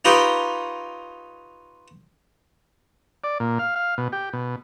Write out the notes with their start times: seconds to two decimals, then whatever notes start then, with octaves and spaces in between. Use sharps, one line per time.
0.05 D#4 F4 G4 B4 C#5
3.24 D5
3.40 A#2
3.59 F5
3.76 F5
3.98 B2
4.12 G4
4.33 B2